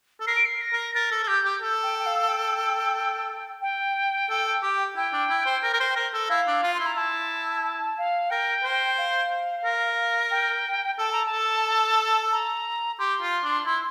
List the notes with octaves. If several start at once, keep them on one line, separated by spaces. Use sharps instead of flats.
A4
A#4 C7
D7
C7
A#6
A#4
A#4 A6
A4
A4
G4 G6
G4
A4
G5
G5
F5
G5
G5
A4
G4
E4 G5
D4
E4
C5
A#4
A#4
C5
A#4
A4
E4 F5
D4
F4
C6
E4
A#5
E4 A5
A5
F5
A#4 G5
C5
F5
A#4
G5
A4 A5
A#5
A5
A4
A#5
G4 C6
F4
D4
E4